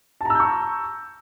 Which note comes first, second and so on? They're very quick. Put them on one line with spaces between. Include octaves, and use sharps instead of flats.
A5 A#5 E6 G6 C#6